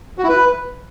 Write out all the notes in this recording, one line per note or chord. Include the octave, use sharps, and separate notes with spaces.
F#4
E4
B4